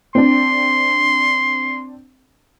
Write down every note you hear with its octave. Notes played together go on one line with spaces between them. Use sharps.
C4 D4 C6